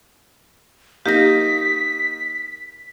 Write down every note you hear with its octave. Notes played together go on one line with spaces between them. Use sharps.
A#3 D#4 G4 A#6 B6